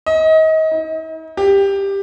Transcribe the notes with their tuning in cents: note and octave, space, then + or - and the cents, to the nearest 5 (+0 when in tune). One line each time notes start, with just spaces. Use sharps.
D#5 +30
D#4 +45
G4 +10